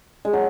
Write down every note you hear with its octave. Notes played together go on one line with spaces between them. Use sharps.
G#3
F#3